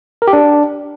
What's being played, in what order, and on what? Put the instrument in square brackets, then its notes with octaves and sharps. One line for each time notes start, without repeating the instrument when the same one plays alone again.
[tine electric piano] A#4
G4
D4